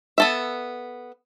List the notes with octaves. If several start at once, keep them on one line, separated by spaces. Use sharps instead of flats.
B3 A4 E5